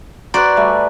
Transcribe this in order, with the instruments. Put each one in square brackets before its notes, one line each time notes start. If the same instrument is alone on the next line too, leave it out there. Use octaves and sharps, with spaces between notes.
[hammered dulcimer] F#4 B4 [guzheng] C5 D5 [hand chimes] A#5 F#6
[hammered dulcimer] G3 A3 G#5